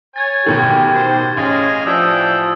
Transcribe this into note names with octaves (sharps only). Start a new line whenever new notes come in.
C#5 G#5 G#6 A6
A1 B2 D#3 G4
C5
A1 C#4 G#4 D#5 F5
E3 F3 D4 G4 D#6 E6